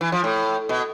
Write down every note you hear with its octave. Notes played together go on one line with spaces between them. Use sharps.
E3
F3
A2
B2